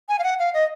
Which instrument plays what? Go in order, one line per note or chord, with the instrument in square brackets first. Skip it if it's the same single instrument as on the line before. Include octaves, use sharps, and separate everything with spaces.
[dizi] G#5
F5
F#5
F5
D#5